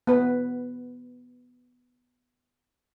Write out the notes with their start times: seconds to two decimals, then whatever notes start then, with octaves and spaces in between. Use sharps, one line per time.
0.07 B3 B4